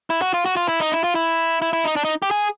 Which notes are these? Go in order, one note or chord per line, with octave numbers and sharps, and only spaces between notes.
E4
F#4
F4
F#4
F4
E4
D#4
E4
F4
E4
E4
E4
D#4
D4
D#4
G4
G#4